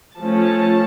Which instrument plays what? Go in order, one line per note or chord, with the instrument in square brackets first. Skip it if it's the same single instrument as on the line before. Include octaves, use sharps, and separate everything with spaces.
[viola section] F3 A3 C#4 A5